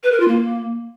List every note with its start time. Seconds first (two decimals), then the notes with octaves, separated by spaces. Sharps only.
0.03 B4
0.12 A#4
0.20 F4
0.28 A#3